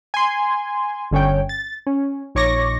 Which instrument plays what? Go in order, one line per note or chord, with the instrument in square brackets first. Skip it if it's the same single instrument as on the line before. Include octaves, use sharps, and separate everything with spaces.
[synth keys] G#5 C6
G1 D3 C#4 C#5 G5
A6
C#4
A#1 D#4 C#5 C#6 D6 A#6